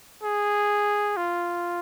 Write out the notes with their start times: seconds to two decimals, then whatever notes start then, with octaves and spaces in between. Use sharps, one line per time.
0.24 G#4
1.17 F4